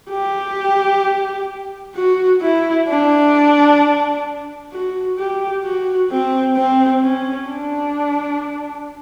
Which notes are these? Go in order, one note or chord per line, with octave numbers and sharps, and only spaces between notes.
G4
F#4
E4
D4
F#4
G4
F#4
C4
C4
C#4
D4